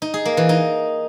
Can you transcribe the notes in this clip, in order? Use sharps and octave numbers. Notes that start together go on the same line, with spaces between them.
D#4
G#4
A#3
E3
D#4